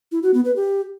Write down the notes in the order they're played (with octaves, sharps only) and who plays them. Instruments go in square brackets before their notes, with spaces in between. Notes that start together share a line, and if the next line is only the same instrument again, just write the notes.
[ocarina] E4
F#4
B3
B4
G4